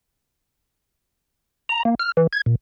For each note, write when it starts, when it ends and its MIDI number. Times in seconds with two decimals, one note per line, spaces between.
1.69 1.83 82
1.85 1.95 58
2.00 2.12 89
2.17 2.27 52
2.33 2.42 92
2.46 2.55 46